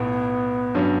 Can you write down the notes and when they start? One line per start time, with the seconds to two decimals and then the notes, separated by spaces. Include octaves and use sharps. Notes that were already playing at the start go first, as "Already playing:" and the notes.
Already playing: B1 A2 B3
0.75 G2 F#3 C#4